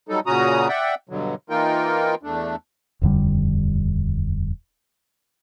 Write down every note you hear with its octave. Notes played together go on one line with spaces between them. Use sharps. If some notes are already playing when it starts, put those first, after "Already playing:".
F#3 G3 D#4 A4
A#2 C#3 C#4 F#4 A#5 D#6
D5 E5 F#5 G5
G2 B2 D3 F#3
E3 A#3 D#4 F4 A#4 G5
E2 A3 D4
D#1 F2 D3 G3